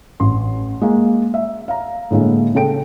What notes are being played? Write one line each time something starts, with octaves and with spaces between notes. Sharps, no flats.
A1 C6
G#3 A#3
E5
F5 A#5
A2 D3 G#3 A#3 E4
C#3 G#4 A4 G5 D7